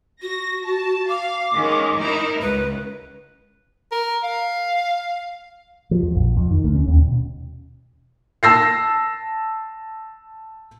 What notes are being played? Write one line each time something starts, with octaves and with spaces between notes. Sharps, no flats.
F#4 A#6
A5
F5 D6
D#3 G#3 C#4
D#4 E4 A#4
C#2 B4
A#4
F5
F3
F2
A#1
F2
D#3
D2
C#4
D#2
B2
A5 E6 A#6 C7